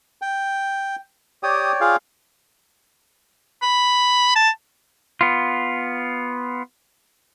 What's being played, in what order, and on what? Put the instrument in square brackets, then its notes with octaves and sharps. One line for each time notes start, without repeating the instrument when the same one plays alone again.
[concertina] G5
[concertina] G4 D#6 [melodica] C#5 D5 G5
[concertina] F4 G#4 F5
[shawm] B5
A5
[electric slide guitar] B3 F4